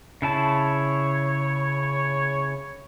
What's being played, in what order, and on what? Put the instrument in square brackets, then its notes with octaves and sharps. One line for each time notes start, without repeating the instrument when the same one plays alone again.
[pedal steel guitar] C#3 E4 A5 [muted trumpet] C#5